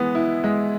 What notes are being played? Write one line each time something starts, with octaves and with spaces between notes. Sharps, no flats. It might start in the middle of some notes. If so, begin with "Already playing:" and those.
Already playing: E3 G#3 B3
E4
G#3